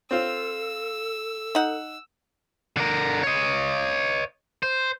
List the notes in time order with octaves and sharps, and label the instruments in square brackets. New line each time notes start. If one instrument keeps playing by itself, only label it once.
[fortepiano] C4 F4 [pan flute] A4 [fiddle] E6
[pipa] D#4 F#5
[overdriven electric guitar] D3 A#4
C#5 D#5
C5